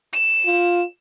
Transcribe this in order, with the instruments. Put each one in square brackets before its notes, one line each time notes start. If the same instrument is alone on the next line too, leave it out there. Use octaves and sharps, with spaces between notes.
[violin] E7
[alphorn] F4